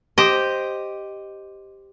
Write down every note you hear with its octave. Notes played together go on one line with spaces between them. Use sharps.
G4 C5 D#5